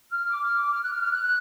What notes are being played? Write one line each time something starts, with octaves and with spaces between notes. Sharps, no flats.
F6
D6
F6
D6
F6
F#6
F6
F6
F#6
F#6